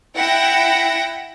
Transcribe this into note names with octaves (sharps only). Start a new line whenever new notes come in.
E4 F#5 G5 A#6